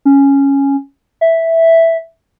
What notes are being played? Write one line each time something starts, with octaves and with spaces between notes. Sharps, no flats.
C#4
E5